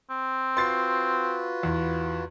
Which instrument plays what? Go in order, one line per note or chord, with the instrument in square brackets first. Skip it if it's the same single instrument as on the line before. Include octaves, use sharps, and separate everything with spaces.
[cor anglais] C4
[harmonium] F4 F#4 B4 [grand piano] C6 A6 C7
[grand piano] E2